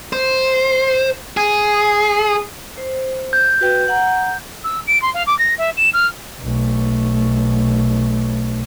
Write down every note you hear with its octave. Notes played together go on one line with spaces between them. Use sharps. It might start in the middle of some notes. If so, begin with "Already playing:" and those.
C5
G#4
C5
G6
F#4 B4 G5
F#5 A#5
E6
D7
C6
F5
D6
A#6
E5
E7
F6
B1 A3